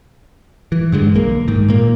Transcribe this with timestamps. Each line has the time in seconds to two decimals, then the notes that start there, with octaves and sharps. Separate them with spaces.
0.72 E3
0.92 G2 D3 G#3
1.14 B1 A#3
1.48 G#2 D#3
1.68 A#2 A#3